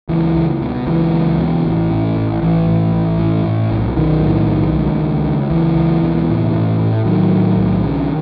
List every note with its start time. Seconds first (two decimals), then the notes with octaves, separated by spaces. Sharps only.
0.09 C#2 E3
0.36 C#2
0.62 B2
0.87 C#2 E3
1.13 C#2
1.39 B2
1.65 A1
1.90 A2
2.16 A1
2.41 A1 E3
2.67 A2
2.93 A1
3.18 A2
3.44 A2
3.71 B1
3.97 B1 D#3
4.22 A2
4.47 B1
4.73 C#2
5.00 C#2
5.25 C#2
5.50 C#2 E3
5.76 C#2
6.02 B2
6.28 A2
6.54 A2
6.80 A2
7.05 A2 D#3 F#3
7.32 A2
7.57 B1
7.83 C#3